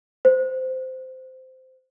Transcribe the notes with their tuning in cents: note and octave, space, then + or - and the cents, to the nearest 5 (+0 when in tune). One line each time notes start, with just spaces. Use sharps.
C5 -15